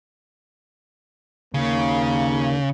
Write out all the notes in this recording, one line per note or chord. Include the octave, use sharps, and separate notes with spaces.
D#2 C#3 A#3